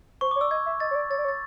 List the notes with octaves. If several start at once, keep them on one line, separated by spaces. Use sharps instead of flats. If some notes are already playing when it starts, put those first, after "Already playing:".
C5 C#6
D6
C#5
D5 E6
D#5 G#6
E5
D#5 A6
C#5
D5
C#5 A6
D5
C#5
A6